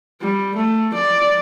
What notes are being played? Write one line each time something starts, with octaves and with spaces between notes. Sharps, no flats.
G3
A3
D5